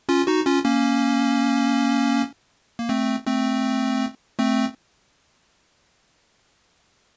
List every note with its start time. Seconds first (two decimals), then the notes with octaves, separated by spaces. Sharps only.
0.09 C#4 F4
0.27 D#4 F#4
0.46 C#4 F4
0.65 A#3 C#4
2.79 A#3
2.89 A3 C4
3.26 A3 C4
4.39 A3 C4